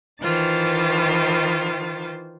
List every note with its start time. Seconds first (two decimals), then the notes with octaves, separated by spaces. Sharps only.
0.22 D#3 E3 F4 C5 A6